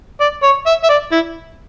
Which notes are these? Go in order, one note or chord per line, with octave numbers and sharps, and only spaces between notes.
D5
C#5
E5
E5
D5
E4